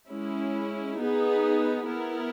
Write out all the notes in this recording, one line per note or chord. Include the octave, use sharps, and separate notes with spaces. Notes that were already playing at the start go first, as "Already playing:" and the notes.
G#3 C#4 E4
B3 D#4 G#4 B4
B3 E4 A#4